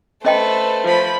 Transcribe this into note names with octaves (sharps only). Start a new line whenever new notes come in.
A3 C#4 B4 C5 D#5 G5
F3 B5